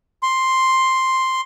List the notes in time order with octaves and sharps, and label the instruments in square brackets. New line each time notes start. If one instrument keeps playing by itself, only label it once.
[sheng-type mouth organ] C6